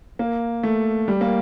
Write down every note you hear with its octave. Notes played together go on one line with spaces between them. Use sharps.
A#3
A3
G3
A#3